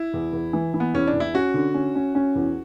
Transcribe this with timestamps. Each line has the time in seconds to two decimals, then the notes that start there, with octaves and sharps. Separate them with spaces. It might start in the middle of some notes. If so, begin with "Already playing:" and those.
Already playing: E4
0.13 E2
0.33 E2
0.53 E3
0.74 E3
0.80 B3
0.94 E2 C#4
1.07 D4
1.14 E2
1.20 E4
1.34 C#4 F#4
1.54 D3
1.74 C#4
1.95 C#4
2.15 C#4
2.35 E2